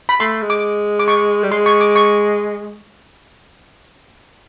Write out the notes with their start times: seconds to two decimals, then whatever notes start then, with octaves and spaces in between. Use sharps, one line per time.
0.09 B5
0.20 A3 C6
0.42 G#3
0.50 D6
0.99 D6
1.08 C#6
1.44 G3
1.51 G#3 C6
1.66 C#6
1.81 D6
1.96 C#6